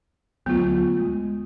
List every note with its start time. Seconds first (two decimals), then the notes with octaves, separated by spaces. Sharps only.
0.46 D2 F#3 A3 B3 F4
1.00 G#3